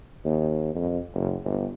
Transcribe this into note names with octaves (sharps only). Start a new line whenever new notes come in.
D#2
F2
F#1
G1